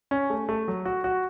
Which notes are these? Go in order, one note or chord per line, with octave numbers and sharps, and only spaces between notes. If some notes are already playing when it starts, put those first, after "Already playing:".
C#4
A3
A3
F#3
F#4
F#4